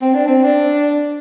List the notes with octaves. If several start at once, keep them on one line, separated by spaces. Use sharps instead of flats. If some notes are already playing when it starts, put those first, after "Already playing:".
C4
D4
C4
D4